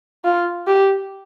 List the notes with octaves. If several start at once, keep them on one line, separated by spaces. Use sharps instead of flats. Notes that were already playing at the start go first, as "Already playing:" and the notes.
F4
G4